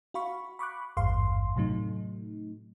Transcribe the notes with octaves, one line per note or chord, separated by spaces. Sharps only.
F#4 F5 B5 C#6
B5 C#6 D6 F#6
G#1 E2 G2 F5 C6
A2 C3 F#3 A3 D#4